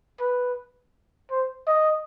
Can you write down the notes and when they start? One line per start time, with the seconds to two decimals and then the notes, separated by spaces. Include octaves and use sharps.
0.20 B4
1.31 C5
1.67 D#5